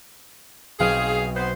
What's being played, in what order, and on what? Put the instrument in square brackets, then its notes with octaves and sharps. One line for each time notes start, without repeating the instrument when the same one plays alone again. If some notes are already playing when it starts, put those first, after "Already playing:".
[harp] B1 C4 G5 [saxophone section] G#4 F5
[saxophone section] B3 C5